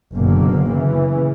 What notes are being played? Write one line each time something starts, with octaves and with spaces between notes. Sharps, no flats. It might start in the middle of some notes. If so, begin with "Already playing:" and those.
F#1 F#2 B2 D3 F#3 A#3
C#3 E3